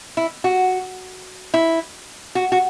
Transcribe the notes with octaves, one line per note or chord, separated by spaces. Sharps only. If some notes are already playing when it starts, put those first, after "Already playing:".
E4
F#4
E4
F#4
F#4